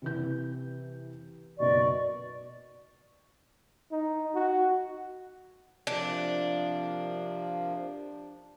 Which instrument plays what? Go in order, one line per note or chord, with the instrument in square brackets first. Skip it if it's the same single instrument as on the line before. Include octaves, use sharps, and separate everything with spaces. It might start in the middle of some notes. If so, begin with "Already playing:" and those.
[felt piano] C3 E3 G6
[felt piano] B1 F#2 B2 [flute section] D5 D#5 C#6
[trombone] D#4
F#4
[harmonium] C3 F3 A#3 [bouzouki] D4